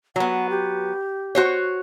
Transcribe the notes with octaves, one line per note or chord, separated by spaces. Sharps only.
F#3 B3 F#5
G4
F#4 C5 C#5